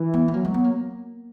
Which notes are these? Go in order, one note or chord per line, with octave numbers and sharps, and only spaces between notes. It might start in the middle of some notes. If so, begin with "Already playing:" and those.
Already playing: E3
B3
B3
F#3 A#3
G#3
B3
A#3